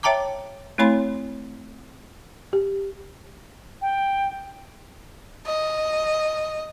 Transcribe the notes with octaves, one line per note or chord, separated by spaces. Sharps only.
C#5 E5 G5 A5 A#5 D6
A3 C4 E4 C#5 B5 C6
G4
G5
D#5